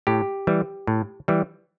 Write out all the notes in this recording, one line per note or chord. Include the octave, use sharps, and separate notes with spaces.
A2 G4
E3 G3
A2
E3 G3